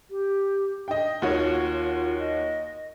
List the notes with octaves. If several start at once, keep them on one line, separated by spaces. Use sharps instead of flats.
G4
D4 D#5 G5
D#2 F4 F#4 C#5
D#5